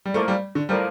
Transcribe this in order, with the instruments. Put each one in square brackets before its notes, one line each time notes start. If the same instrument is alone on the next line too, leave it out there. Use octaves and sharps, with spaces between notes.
[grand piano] G3
[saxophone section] A2 F3 A#3 [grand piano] A3
[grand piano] G3
D3
[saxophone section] A2 F3 A#3 [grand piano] G3